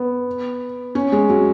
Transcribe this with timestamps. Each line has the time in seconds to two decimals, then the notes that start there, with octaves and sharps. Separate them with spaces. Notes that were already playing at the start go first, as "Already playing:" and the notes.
Already playing: B3
0.95 C#4
1.12 G#3
1.29 F#3